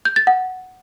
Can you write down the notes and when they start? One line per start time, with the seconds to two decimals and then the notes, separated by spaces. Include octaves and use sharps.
0.05 G6
0.16 A6
0.27 F#5